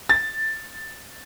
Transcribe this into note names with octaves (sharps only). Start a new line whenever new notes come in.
A6